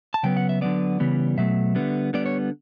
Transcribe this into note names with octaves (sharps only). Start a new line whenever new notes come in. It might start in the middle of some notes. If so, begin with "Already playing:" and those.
A5
C#3 F#3 B3 G5
F#5
E5
D3 F#3 B3 D5
C#3 E3 G3 B3
B2 F#3 A3 E5
D3 G3 B3
D3 G3 B3 D5
C#5